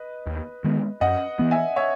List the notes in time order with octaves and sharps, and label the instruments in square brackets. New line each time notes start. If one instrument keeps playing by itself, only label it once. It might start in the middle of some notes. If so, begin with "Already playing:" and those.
Already playing: [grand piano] B4 D#5
[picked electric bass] D#2
D#3 G#3 B3
[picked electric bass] F#2 [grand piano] D#5 F#5
[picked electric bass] E3 B3
[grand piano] E5 G#5
C#5 E5